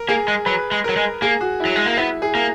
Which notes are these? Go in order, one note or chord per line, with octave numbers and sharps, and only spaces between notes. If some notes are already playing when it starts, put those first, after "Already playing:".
Already playing: A#4
A#3 G#4
G#3
F#3 B4
G#3
F#3 A#4
G#3
A#3 G#4
F#4
E4
F#3
G#3
A#3
B3 E4
G#4
A#3